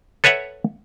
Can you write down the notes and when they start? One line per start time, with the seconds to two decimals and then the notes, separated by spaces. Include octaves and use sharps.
0.24 A4 B4 C#5 E5 F#5